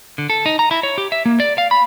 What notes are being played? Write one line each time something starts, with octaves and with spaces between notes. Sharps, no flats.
D3
A4
D#4
A#5
E4
C#5
G4
E5
A#3
D5
F5
B5